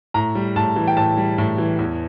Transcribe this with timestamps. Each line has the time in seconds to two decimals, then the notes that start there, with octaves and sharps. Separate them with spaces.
0.14 A2 A#5
0.35 G3
0.56 A2 A5
0.76 E3
0.88 G5
0.97 A2 A5
1.17 G3
1.38 A2
1.58 E3
1.79 E2